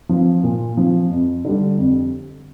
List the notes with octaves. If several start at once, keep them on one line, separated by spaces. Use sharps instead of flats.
F3 C4
A#2
F3 C4
F2
D3 G3
F2